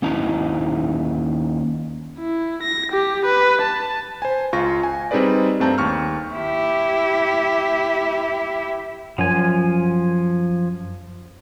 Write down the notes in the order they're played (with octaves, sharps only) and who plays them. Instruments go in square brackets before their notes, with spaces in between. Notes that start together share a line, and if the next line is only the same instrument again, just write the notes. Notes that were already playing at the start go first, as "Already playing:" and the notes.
[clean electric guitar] D#2 C#4 D#4 E4 A#5
[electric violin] E4
A#6
G4
B4
A5
[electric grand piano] C5 G#5
C#2 F4 C#6 A#6
G#5
G3 C4 D#4 G#4 B4 D5
G2 A3 C4 A5 A#5 G6
D#2 C#6 F6
[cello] E4 G4
[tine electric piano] F#2 [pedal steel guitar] F3 G#5